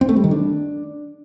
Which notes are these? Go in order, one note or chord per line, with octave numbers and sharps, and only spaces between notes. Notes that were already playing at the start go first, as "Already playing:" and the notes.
C4
A3
G3
D#3
D4